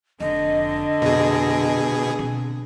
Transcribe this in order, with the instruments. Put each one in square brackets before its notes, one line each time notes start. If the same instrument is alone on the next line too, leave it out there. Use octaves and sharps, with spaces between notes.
[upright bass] F1 [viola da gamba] D3 [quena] D#5
[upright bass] F2 F#3 [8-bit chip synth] B2 G#4
[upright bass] B2 C4